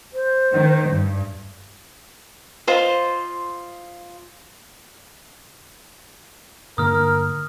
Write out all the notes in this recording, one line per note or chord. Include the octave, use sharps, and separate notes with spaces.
C5
D#3
G2
F4 C5 D#5
G2 D3 A#3 A#4 D#6 F6